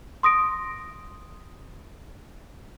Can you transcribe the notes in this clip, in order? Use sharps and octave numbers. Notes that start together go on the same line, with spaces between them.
C6 D#6 A#6 D7